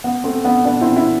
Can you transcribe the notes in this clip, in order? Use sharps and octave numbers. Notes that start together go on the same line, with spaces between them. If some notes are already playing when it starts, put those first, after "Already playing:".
B3
A3 C4
B3 D4
B3 D4
C4 E4
C4 E4